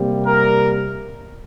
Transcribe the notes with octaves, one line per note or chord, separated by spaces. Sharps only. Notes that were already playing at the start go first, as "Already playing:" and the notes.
Already playing: C3 G3 A#3
A#4